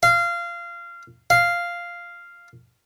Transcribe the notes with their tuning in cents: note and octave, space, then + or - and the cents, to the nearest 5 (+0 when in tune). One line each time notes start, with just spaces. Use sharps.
F5 -20
F5 -5